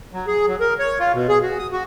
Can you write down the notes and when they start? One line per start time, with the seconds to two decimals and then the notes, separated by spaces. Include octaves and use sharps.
0.13 F#3
0.27 G#4
0.48 F#3
0.61 A#4
0.79 C#5
1.00 F4
1.14 B2
1.29 G#4
1.43 F#4
1.59 D#6
1.72 F#4